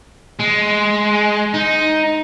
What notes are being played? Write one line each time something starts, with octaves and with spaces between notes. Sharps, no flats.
G#3
D#4